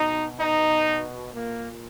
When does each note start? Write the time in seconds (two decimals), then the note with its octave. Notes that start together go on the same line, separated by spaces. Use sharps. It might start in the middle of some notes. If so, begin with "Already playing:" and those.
Already playing: B2 D#4
0.40 D#4
1.34 A#2 A#3